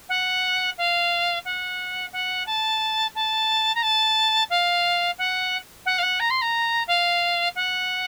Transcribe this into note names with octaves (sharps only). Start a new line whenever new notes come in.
F#5
F5
F#5
F#5
A5
A5
A#5
A5
F5
F#5
F#5
F5
F#5
A#5
C6
A#5
F5
F#5